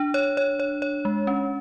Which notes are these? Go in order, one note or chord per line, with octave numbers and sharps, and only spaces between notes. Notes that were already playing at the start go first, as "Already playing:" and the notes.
Already playing: D4
C#5
C#5
C#5
C#5
G#3
C#4